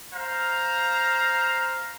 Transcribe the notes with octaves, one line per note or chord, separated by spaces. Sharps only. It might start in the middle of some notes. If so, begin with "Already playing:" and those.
C5 F5 A#5